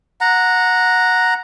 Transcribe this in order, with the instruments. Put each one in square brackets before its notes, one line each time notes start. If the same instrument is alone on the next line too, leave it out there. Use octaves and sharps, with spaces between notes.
[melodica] F#5 A#5